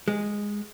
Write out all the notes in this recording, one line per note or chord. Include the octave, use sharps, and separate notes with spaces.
G#3